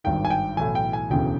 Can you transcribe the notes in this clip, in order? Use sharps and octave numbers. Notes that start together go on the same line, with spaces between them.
G#1 G2 D#3 G5
G#5
G5
B1 A2 E3 G#5
G5
G#5
E1 D2 C#3 E3 G5